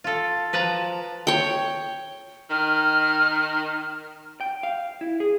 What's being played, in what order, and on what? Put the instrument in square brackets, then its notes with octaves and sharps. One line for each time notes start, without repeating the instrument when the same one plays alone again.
[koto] F4 A4
F3 B4 A5 A#5
[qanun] C#5 G5
[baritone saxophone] D#3 [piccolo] F6
[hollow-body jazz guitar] G5
F5
E4
G#4